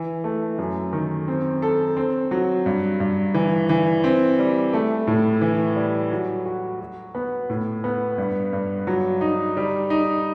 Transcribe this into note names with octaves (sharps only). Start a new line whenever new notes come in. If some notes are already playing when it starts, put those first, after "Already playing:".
Already playing: E3
A3
F#2
D#3
C4
A4
C4
F#3
G2
G2
E3
E3
C4
G3
A3
A2
E3
G3
F#3
F#4
F#4
B3
A2
B3
G2
G2
F#3
D#4
G3
D#4